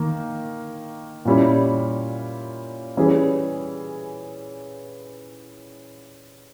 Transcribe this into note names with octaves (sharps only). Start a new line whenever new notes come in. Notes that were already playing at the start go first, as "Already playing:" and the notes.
Already playing: D#3 A#3
A#2 G3 C#4 E4
E3 G3 C#4 G#4